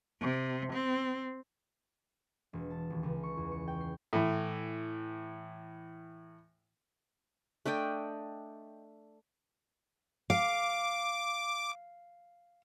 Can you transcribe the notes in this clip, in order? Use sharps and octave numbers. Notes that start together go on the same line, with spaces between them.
C3
C4
E1
A5
D#1
C#2
C#6
E2
C#6
G5
C7
A2 E3
A3 D4 D#5 G5
F5 D6